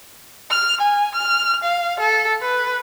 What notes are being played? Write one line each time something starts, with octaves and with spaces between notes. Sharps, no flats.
F6
G#5
F6
F5
A4
B4